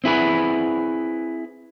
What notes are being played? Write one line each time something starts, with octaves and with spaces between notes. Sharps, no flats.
C4 E4 G#4 B4